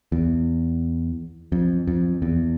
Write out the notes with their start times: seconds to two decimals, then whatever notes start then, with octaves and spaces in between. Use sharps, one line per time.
0.12 E2
1.52 F2
1.87 F2
2.22 E2